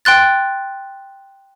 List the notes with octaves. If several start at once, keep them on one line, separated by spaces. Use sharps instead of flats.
G5 C6 F#6 A6